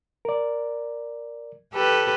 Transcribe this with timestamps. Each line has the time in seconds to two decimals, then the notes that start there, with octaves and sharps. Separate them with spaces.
0.25 A#4 D5
1.73 G4 A4 B4